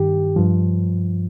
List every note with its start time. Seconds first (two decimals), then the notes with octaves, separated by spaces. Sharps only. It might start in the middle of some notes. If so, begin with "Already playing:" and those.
Already playing: G2 D#3 G4
0.36 G2 F3